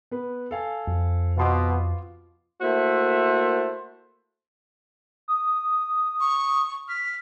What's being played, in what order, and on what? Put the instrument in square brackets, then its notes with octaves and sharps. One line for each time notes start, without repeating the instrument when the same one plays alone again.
[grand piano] B3 B4
A4 F5 G#5
[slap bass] F2
[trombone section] B2 [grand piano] F4 C6 D6
[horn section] A3 A#3 E4 F#4 C5
[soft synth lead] D#6
[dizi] C#6
[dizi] F6 [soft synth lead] B6